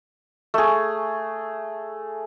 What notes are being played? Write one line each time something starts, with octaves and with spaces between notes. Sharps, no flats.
A3 G#4